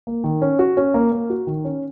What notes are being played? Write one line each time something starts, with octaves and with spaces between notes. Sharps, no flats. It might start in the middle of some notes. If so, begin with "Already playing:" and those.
A#3
D#3
C#4
F#4
C#4
A#3
A#3
F#4
D#3
C#4